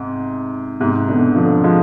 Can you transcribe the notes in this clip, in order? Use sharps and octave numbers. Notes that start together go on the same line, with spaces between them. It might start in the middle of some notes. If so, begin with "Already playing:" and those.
Already playing: G#2 C3
G#2 C3
B2 D3
D3 F3
F3 G#3